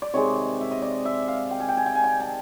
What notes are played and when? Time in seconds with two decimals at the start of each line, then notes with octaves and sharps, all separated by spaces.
0.02 D5
0.14 C3 D#3 G#3 C#5
0.61 E5
0.71 D#5
0.82 D5
1.05 E5
1.28 F5
1.51 G5
1.60 G#5
1.68 G5
1.77 G#5
1.86 G5
1.95 G#5
2.04 G5
2.20 A5